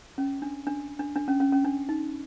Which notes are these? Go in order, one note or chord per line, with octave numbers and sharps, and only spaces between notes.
C#4
D4
D4
D4
D4
C#4
C#4
C#4
D4
D#4